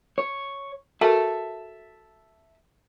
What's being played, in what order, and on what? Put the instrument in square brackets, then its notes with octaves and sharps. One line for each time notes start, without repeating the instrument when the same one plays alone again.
[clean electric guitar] C#5
[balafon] F#4 A4 A#4 [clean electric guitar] E5 A5